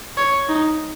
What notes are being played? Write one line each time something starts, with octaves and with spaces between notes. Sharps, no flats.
C#5
D#4